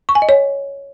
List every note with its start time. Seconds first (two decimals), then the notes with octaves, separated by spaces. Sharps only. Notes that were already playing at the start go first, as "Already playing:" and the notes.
0.09 C#6
0.15 G#5
0.22 D#5
0.29 C#5